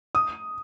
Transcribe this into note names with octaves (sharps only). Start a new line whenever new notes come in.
D#6